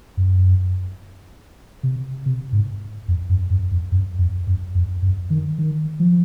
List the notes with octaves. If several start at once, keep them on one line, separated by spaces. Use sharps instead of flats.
F#2
C3
C3
G#2
F2
F#2
F#2
F2
F#2
F2
F#2
F2
F#2
D#3
D#3
F3